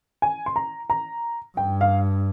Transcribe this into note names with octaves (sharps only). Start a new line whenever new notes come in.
G#5
C6
A#5
A#5
G2 G5
F5